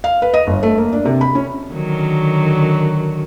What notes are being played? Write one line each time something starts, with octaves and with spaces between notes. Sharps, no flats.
F5
B4
D#5
G1
A3
A#3
D4
C3
B5
C#4
D3 D#3 F#3